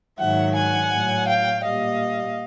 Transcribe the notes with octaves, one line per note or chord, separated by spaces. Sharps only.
G#2 D#3 F#3 E5 F#5
F#5 G#5
A2 F#3
F5 G5
A#2 G3 D#5 F5